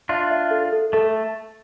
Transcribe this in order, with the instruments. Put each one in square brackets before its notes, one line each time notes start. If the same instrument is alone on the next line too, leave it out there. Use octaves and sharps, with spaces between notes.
[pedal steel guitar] D4 F4 [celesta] E5
[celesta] E5
A4
A4
[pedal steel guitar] A3 [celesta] A4